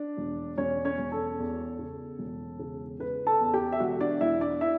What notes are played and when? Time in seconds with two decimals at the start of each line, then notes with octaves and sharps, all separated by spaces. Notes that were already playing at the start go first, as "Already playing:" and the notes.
Already playing: D4 D5
0.17 E1
0.57 E1 C#4 C#5
0.85 C#4 C#5
0.98 E1
1.12 A4
1.39 E2
1.79 C#3
2.19 E1
2.59 C#3
3.00 C#3 B4
3.27 A4 A5
3.40 E2
3.54 G4 G5
3.73 E5
3.80 E1 F#4 F#5
4.01 D4 D5
4.21 E1 E4 E5
4.41 D4 D5
4.61 E4 E5